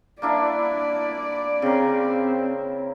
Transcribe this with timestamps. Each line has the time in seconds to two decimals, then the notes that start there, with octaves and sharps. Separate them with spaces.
0.22 A#3 D4 E4 D5
1.62 C#3 C4 A#4